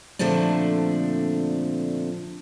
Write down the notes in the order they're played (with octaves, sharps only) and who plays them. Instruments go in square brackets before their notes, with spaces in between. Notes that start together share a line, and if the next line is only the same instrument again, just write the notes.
[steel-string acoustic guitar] A#2 D3 F3 A3 C4 D4